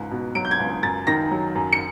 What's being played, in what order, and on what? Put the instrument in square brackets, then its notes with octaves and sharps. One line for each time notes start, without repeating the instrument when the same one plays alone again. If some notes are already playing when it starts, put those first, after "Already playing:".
Already playing: [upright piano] C#2 G#2
B2
F#3 D7
G6
G#6
C#2
F#2 A6
D#3 A#6
F#3
F#2
C#7